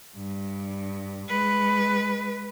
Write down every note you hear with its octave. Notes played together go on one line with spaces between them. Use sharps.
G2
G#3 B4